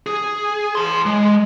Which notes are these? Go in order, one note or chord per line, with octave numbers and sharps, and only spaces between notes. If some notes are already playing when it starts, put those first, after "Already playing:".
G#4
A5 C6
G#3